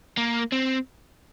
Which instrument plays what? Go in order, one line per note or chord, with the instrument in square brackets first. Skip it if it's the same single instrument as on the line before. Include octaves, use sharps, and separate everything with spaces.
[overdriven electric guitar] A#3
C4